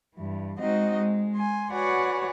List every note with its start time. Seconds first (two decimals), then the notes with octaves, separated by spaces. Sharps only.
0.15 G2 E3
0.59 G#3 C4 D#4 F#4 D#5
0.97 G#3
1.35 G#5 C6
1.72 F#4 B4 C#5 D5 F#5 G#5